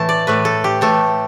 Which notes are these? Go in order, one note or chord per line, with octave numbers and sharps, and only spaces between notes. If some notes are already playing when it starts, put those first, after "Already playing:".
Already playing: A2 E3 A3 A5
D5
A2 E3 A3 B4
A4
G4
A2 E3 A3 A4